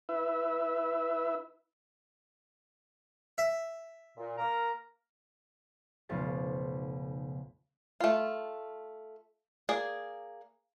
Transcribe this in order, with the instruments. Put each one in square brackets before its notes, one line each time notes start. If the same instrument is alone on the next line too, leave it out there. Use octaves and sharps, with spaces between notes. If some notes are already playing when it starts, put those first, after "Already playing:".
[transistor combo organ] E4 B4 E5
[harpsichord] E5
[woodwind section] A#2
A#3 A#4 A#5
[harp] F1 B1 C#3 C5 C#6 A6
[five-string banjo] A3 F4
A#3 G#4 D5